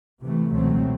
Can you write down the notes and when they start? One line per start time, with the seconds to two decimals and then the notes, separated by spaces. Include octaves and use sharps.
0.22 C3 E3 A3
0.52 C#2 B2 F#3 A3 C4